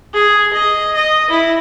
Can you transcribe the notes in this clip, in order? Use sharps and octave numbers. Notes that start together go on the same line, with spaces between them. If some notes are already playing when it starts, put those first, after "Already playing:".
G#4
D#5
D#5
E4